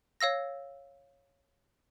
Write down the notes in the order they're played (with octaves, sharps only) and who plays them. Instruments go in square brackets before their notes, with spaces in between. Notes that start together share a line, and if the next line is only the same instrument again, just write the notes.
[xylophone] C#5 F5 E6 A#6